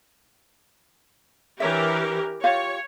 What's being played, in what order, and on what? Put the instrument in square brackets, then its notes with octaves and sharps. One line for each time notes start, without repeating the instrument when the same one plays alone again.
[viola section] E3 G4 A#4 [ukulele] D4 C#5 E5
[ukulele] F4 G4 F5 [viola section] C#5